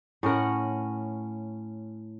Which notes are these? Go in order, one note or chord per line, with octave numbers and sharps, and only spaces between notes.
A2 C#4 A#4 F#5